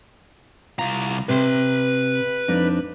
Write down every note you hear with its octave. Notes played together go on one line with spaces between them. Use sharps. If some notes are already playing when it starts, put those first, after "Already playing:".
C2 F4 A#5
C3 B4 C6
F2 D4 D#4